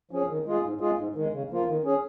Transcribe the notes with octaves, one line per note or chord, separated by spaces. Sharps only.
F3 C#4 G#4
D#3
G#3 F4 G#4
G#2
G#3 F4 G#4
G#2
D#3 G#3
C#3
F3 A#3 F4
D#3
C#4 G#4